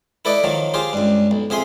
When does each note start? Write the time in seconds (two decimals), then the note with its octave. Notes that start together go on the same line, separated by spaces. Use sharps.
0.25 E4 A4 B4 D5 D#5
0.44 D#3 F3 F#3
0.74 F4 G4 G#4 C5
0.93 C#2 G2
1.31 B1
1.50 F2 G#4 E5 G#5 C6